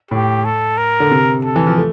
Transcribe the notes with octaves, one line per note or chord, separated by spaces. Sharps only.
A2 G4
A4
A#4
D3
C3
A4
E3
F3
A3